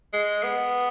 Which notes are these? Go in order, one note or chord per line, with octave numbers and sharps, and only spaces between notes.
G#3
B3